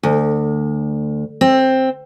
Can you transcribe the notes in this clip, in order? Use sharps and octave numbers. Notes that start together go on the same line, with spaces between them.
D2
C4